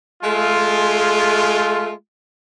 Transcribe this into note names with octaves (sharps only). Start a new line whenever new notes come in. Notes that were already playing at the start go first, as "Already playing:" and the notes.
G#3 A3 F4